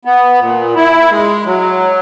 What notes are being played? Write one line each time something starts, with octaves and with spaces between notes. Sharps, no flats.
B3
A#2
E4
G#3
F#3